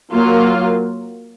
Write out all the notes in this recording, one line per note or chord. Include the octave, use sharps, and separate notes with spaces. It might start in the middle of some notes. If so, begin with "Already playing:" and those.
F#3 A#3 F4